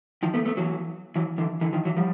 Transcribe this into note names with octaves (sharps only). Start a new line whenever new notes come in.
D#3 F3
A3 B3
A3 B3
E3 F#3
E3 F#3
D3 E3
D3 E3
D#3 F3
E3 F#3
F3 G3